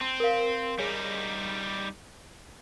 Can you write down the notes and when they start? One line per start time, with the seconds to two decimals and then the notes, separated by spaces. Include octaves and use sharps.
0.01 C4 A5
0.20 A#4 F5
0.79 G3 D#4 G#4 C#5 G#5